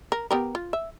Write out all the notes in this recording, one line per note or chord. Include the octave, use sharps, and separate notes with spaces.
A#4
B3 G4 A#4
F4
E5